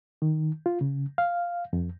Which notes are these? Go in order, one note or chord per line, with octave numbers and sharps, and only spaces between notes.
D#3
F4
C#3
F5
F2